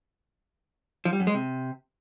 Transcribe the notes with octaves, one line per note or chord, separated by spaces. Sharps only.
F3
G3
F#2
G#3
C3